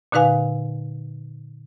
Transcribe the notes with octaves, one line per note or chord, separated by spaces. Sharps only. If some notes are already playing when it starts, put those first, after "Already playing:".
A#2 D3 D#4 B4 F5 G#5